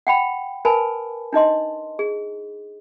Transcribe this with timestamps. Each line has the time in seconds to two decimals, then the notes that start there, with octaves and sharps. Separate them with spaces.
0.07 F#5 G5 B5
0.65 A#4 B4 G#5 A5 B5
1.33 D4 D#4 D#5 C6
1.99 G#4